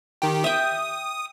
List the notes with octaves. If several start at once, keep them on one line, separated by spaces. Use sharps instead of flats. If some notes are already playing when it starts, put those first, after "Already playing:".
D#3 G4
E5 G5 D#6